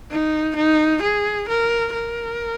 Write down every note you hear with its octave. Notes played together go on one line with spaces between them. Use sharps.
D#4
D#4
G#4
A#4
A#4